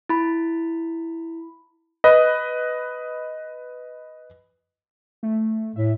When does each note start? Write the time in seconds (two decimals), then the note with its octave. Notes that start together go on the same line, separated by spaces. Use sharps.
0.09 E4 B5
2.04 B4 D#5
5.23 A3
5.76 A2 E5